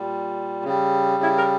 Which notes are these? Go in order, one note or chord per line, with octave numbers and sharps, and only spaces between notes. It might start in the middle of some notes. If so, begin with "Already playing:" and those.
Already playing: A#2 G3
C#3 G3
E4
A#4